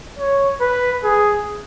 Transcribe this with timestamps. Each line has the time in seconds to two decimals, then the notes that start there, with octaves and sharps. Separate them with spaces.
0.19 C#5
0.61 B4
1.04 G#4